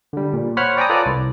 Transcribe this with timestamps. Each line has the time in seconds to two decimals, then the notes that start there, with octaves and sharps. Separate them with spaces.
0.13 D3 G3
0.33 A#2
0.57 C5 C#5 F#5 B5 F6
0.77 D5 G5 G#5 A#5 D#6
0.90 F4 A4 B4 C#5 D5
1.06 C2